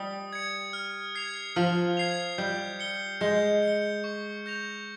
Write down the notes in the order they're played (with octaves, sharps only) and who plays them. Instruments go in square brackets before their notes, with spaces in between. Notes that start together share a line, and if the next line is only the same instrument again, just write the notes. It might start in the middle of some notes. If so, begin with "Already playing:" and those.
Already playing: [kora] G3 [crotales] D#6
[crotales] G#6 C#7
F6
G#6 C7 F7
[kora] F3 [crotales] F6
[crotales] G#6 C7 F7
[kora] G3 [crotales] G6
[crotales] C#7 G7
[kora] G#3 [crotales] G6
[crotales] C#7
G7
C#6
G6 A#6 F7